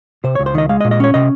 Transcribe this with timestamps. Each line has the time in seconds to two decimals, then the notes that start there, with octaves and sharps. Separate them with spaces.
0.24 C3 C5
0.35 C#2 C#5
0.46 C5
0.54 D#3 D#5
0.69 G#3 F5
0.81 D#5
0.85 A#2
0.91 D#5
1.00 C#4 C#5
1.14 C3 D#5